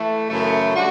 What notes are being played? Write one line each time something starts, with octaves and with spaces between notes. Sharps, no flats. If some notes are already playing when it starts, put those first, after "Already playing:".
Already playing: E3 A3
F#2 C#3 E3 A3
D3 G3 D4 F#4